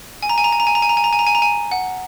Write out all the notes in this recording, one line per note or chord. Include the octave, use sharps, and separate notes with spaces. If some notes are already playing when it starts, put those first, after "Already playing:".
G#5
A#5
G#5
A#5
G#5
A#5
G#5
A#5
G#5
A#5
G#5
A#5
G#5
A#5
G#5
A#5
G#5
F#5